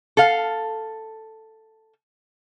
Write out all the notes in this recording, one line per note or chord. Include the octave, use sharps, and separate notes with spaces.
A4 F5